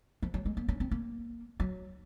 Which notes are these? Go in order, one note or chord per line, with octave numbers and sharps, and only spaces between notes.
F3
F#3
G#3
A#3
C#4
C4
A#3
F#3